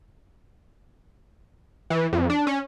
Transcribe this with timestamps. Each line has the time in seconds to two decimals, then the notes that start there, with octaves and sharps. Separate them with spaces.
1.90 E3
2.13 F2
2.30 D4
2.47 C#4